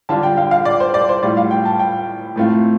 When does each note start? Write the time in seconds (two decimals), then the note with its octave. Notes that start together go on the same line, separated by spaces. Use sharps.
0.09 D3 G3 D4 F4 A5
0.23 G5
0.37 F5
0.51 F5
0.65 D5
0.80 C5
0.94 D5
1.09 C5
1.23 A2 G3 F4 D5
1.37 F5
1.51 G5
1.65 A5
1.79 G5
2.36 A2 A3 C4 F4